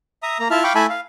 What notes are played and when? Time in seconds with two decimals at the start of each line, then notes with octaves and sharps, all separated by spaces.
0.23 E5 A#5 D#6
0.39 A#3 A#5
0.51 E4 F4 E5 A5 F6
0.64 F5 G5 B5 C#6 D6
0.75 A3 E4 E5 G#5 A5 B5
0.90 F5